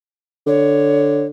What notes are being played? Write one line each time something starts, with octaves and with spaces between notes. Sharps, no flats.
D3 C#5